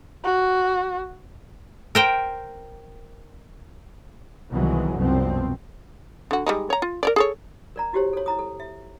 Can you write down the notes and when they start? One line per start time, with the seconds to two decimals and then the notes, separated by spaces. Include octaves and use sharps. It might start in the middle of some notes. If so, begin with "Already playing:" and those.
0.25 F#4
1.95 A#4 C5 G5
4.50 C2 B2 D#3 E3 F#3 G#3
4.96 C2 F#2 B2 F3 C4
6.31 D3 F#4
6.46 G3 G#3 D#4
6.70 C#5 A#5
6.82 F4
7.03 A#4 C#5 D5
7.16 G#4 A4 C#5
7.76 A#4 D5 A#5
7.93 E4 F#4 G4 C5 C#5
8.13 A4 C#5
8.26 E4 A#5 D#6
8.39 A4
8.60 E5